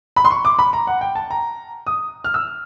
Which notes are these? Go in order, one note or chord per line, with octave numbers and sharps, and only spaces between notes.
B5
C6
C#6
D6
B5
A#5
F#5
G5
A5
A#5
D#6
F6
E6